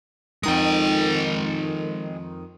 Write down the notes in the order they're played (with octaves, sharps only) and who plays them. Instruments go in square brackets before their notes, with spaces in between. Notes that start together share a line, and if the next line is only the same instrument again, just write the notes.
[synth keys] F2 D#3 D#6 [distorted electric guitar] G#3 G5